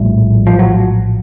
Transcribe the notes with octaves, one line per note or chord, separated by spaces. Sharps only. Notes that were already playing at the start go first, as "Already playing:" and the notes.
Already playing: A#1 A2 G3 A3
F3
F#3